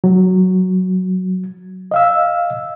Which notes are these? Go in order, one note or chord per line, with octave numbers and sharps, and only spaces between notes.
F#3
D#5 F5 E6